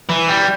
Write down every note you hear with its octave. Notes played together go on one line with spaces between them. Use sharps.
E3
G3